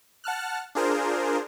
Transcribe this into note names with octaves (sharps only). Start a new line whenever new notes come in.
F#5 A5 F6 F#6
D4 F4 G#4 A#4 C5